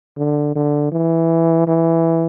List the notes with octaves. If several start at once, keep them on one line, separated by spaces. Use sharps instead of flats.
D3
D3
E3
E3